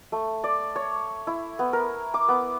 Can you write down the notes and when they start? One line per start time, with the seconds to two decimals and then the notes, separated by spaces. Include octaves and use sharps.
0.12 A3
0.44 D5
0.76 C#5
1.27 E4
1.59 B3
1.73 A#4
2.14 D6
2.28 B3